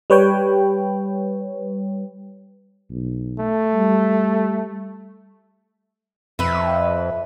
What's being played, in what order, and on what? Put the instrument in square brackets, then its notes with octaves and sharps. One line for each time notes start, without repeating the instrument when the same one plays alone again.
[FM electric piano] G3 B4 C#5 G5
[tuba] B1
[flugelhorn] A3
[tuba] G3
[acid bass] F2 [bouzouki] B4 E5